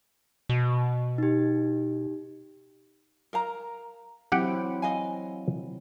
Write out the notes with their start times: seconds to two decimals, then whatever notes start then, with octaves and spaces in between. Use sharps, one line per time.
0.49 B2
1.18 D#4 G4
3.33 A#4 F5 A#5
4.32 F#3 C4 E4 G4 F#5 G5
4.82 D#5 F5 G#5